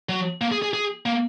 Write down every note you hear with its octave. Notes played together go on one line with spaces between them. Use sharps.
F#3
A#3
G#4
G#4
G#4
A#3